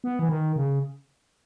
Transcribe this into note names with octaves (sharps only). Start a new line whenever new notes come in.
B3
E3
D#3
C#3